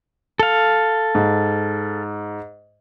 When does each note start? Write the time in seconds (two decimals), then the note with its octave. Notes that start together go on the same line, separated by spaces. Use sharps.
0.39 A4 F5
1.15 G#2